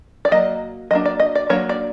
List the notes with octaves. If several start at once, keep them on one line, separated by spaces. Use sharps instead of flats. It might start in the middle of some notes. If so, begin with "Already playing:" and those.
D5
F#3 A#3 D#5
F#3 A#3 D4 D#5
D5
D#5
D5
F#3 A#3 D4 C#5
D5